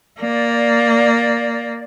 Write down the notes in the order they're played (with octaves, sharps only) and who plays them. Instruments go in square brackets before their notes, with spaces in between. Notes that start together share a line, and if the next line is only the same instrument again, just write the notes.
[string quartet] A#3 [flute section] D5